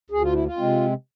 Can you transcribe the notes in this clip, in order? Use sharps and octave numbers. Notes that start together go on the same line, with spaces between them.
D2 G#4
F4
E4
F4
C3 G#3 C4